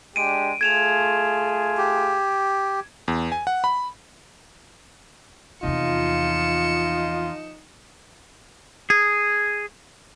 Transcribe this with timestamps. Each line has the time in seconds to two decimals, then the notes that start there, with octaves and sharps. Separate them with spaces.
0.16 G#3 D4 G4 D7 D#7
0.61 A3 F4 G#4 G#6 E7 F7
1.77 G4
3.08 E2
3.32 G#5
3.47 F#5
3.64 B5
5.63 E2 C3 F3 D#4 F4 C#7 E7
8.90 G#4